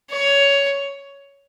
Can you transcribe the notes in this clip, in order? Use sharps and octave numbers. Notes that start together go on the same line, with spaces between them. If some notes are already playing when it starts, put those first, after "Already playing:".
C#5